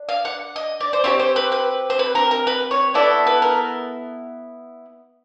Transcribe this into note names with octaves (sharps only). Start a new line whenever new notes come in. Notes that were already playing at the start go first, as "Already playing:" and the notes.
Already playing: D4
F5
F#5
D#5
D5
C5
C4 E4 G4 C#5
C5
B4
B4
C5
B4
A#4
A#4
B4
C#5
B3 E4 A4 D5
B4
A#4